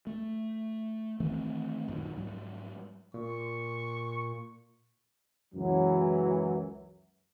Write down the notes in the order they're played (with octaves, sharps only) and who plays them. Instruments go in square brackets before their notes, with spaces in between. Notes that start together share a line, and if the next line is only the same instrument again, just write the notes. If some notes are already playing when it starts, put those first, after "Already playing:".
[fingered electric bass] A3
D#3 E3 A3 C4
A#1 F#2 A#2 D#3
G#2 F#3 G3
[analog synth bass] A#2 [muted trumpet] C#6
[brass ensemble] C#2 F#2 E3 F#3